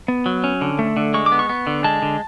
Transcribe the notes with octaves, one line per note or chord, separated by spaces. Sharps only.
B3
F#3
C#4
D3
A3
D3
G#3 C#6
D6
B3
C#6
B3
D3
G#3 A5
D3